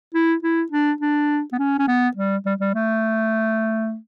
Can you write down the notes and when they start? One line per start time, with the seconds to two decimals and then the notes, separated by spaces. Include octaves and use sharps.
0.14 E4
0.43 E4
0.72 D4
1.01 D4
1.53 B3
1.59 C#4
1.79 C#4
1.88 B3
2.16 G3
2.46 G3
2.61 G3
2.75 A3